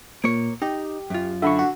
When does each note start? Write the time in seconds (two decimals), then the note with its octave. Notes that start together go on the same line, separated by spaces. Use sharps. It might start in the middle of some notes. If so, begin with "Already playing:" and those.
0.24 A#2 A#3 C#5
0.62 D#4 G4
1.10 F#2 F4
1.42 D3 E5 B5 C#6
1.59 F#4